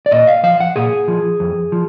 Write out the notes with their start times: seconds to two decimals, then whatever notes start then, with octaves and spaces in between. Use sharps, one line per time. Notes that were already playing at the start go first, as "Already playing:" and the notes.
0.06 D5
0.11 A#2 D#5
0.27 F5
0.43 F3 F5
0.60 F#5
0.76 A#2 G#4
1.08 F3
1.40 F2
1.72 F3